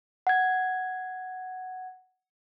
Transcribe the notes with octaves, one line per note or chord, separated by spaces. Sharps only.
F#5 G#6